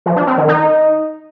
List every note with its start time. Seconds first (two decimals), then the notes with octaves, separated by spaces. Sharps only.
0.06 F3
0.16 D4
0.27 C4
0.38 D#3
0.48 D#4